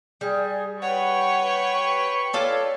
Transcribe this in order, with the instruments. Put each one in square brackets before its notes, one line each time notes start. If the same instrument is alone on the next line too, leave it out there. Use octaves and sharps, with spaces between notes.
[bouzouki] G3 [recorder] G#4
[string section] B4 G5 C#6 [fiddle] C#5 [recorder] F#5
[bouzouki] F4 A4 D5 [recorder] C#5